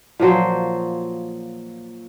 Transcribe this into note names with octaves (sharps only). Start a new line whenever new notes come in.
A#2 F3 F#3 C5